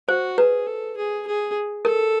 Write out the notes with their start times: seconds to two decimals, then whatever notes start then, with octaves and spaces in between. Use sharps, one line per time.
0.08 F#4 C5
0.38 G#4 B4
0.67 A4
0.97 G#4
1.27 G#4
1.85 A4 A#4